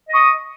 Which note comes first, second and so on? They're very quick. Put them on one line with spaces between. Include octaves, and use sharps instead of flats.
D#5 D#6 C#6